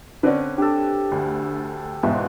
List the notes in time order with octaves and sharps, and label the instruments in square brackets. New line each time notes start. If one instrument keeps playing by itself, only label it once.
[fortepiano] D3 C4 C#4 [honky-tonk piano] B4
[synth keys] D4 [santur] G4 A4
[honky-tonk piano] D2
[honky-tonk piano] E2 G#2 B2 [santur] F4 [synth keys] E5